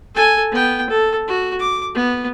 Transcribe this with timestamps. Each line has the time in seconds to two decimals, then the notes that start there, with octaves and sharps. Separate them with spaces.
0.15 A4 G#5
0.52 B3 G5
0.89 A4
1.28 F#4
1.59 D6
1.95 B3